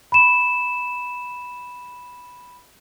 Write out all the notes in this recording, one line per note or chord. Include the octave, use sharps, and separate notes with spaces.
B5 E7